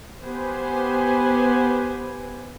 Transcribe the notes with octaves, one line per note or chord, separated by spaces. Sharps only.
B3 G4 B4 C5 G#5